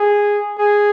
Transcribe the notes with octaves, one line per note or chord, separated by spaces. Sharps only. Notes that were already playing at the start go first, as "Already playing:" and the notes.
Already playing: G#4
G#4